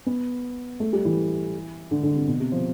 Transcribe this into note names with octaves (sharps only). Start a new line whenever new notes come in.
B3
A3
G3
E3
D3
D3
C3
B2
C3
F3